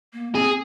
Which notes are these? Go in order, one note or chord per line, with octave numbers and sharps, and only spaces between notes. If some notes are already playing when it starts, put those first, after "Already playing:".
A#3
C4 G#4